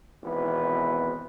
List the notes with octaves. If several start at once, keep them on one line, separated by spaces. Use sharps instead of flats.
G#1 B2 E3 B3 C4 B4